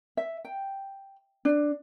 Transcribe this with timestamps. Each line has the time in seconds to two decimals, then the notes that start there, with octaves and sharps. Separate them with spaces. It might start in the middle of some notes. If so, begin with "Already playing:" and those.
0.17 E5
0.45 G5
1.45 D4